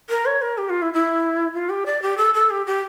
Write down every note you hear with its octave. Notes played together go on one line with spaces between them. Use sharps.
A#4
C#5
A#4
G4
F4
E4
E4
F4
G4
D5
G4
A4
A4
G4
G4